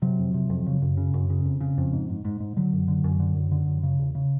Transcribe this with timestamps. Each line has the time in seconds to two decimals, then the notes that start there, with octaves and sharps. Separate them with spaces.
0.02 C3 F#3
0.19 F2
0.34 C3
0.50 F2
0.66 C#3
0.82 F#2
0.97 C#3
1.14 F#2
1.30 C#3
1.45 F2
1.61 C#3
1.78 F2
1.93 G#2
2.09 G#2
2.25 G#2
2.40 G#2
2.56 D3 F#3
2.73 F#2
2.88 D3
3.04 F#2
3.20 D3
3.36 F#2
3.51 D3
3.68 F#2
3.83 C#3
3.99 E2
4.15 C#3